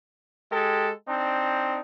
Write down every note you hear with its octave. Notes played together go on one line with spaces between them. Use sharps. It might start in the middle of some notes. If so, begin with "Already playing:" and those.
G#3 G4 A4
C4 D4 D#4